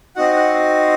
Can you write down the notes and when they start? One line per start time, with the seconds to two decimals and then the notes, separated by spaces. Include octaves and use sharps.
0.16 C4 D#4 F#4 F#5
0.36 F#5